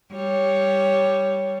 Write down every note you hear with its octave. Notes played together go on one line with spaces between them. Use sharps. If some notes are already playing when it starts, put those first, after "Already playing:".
G3 C#5